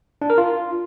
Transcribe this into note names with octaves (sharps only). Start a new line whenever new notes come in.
D4
A#4
F4